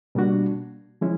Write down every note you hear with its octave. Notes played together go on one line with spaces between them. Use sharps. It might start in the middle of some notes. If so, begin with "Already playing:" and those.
B2 G3 A#3 D4 F#4
F3 G#3 C#4 E4